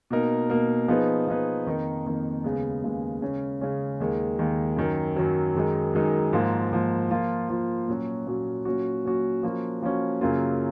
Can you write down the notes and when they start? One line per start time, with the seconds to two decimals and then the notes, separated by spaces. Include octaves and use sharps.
0.10 B2 A#3 D#4 A#4
0.50 B2 A#3 D#4 A#4
0.88 F3 B3 D#4 G#4 B4
1.28 F3 B3 D#4 G#4 B4
1.66 F2 D#3 A#3 D#4
2.06 F2 D#3 A#3 D#4
2.44 D#2 C#3 G#3 B3
2.84 D#2 C#3 G#3 B3
3.22 C#3 G#3 C#4
3.61 C#3 G#3 C#4
4.00 D#2 D#3 G#3
4.39 D#2 D#3 G#3
4.77 F#2 D#3 F#3
5.16 F#2 D#3 F#3
5.55 F#2 D#3 G#3 D#4
5.93 F#2 D#3 G#3 D#4
6.33 G#2 F3 A#3
6.72 G#2 F3 A#3
7.11 F3 A#3 F4
7.49 F3 A#3 F4
7.88 A#2 F#3 C#4 F#4
8.27 A#2 F#3 C#4 F#4
8.65 A#2 F#3 C#4 F#4
9.05 A#2 F#3 C#4 F#4
9.43 F3 A#3 C#4 F#4
9.82 F3 A#3 C#4 F#4
10.21 F#2 C#3 F#3 A#3 F4